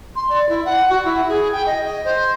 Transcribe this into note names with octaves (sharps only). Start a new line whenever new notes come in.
C6
D5
E4
F#5
F#4
E4
G#4
G5
D#5
D#5
C5